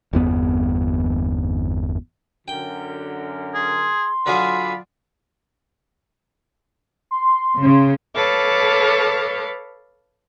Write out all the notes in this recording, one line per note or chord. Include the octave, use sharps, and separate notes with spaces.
G1 E2 B3
F#2 D3 A#4 G5
G#4 C6
D3 F#3 F4 G#4 D5 F5 B5
C6
C#3
A4 B4 C#5 F5 A5 D6